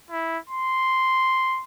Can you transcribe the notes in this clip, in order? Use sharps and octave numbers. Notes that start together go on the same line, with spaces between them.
E4
C6